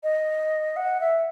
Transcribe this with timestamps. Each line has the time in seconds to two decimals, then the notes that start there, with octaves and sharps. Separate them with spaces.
0.03 D#5
0.76 F#5
1.01 E5